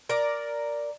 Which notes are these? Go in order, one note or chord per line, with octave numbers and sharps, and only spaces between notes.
A#4 D5